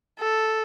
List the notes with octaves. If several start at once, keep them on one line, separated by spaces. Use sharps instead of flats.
A4